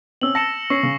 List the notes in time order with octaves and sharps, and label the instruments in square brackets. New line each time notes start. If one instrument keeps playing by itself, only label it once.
[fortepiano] C4 C#4 [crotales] E6 F#7
[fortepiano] A5 [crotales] A#6 C#7 E7
[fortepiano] C#4 [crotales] C#6 E6 C7
[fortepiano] C#3